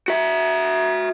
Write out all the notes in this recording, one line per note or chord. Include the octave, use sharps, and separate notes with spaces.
F#4 E5